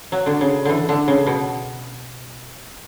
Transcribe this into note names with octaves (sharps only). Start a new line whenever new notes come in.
F#3
D3
C#3
D3 E3
D3
C#3
B2